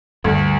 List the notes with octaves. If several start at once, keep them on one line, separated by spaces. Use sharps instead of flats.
D2 G2